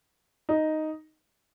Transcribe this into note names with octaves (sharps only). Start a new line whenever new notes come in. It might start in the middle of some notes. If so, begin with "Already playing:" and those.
D#4